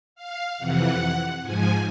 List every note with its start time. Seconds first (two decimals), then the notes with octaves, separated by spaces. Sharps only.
0.15 F5
0.58 F2 C3 E3 F#5
1.42 G#2 F3 G#5